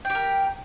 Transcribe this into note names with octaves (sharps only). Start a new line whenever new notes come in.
G4 A#4 G5